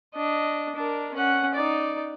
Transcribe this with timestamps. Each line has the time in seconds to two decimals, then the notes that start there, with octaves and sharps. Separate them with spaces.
0.15 D4 D#5
0.75 D4 A#4
1.14 C#4 F#5
1.55 D#4 D5